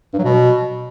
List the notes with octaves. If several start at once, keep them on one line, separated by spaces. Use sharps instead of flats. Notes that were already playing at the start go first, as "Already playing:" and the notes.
G2
F#3
B2